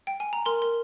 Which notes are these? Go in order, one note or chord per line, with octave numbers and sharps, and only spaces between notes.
G5
G#5
A#5
A#4 C6
A#4